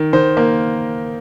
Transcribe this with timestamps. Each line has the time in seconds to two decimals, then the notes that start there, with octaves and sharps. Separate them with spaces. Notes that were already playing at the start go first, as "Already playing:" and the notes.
Already playing: D#3
0.13 D#3 C5
0.37 A#3